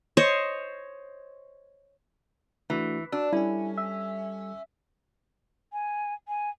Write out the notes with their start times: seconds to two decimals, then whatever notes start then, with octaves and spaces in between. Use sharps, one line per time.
0.17 C5 C#5 D#5
2.70 E3 A3 D4 F#4
3.12 D4 F#4 E6
3.33 G3 C#4 E4 A4 G#5
3.77 E5
5.73 G#5
6.28 G#5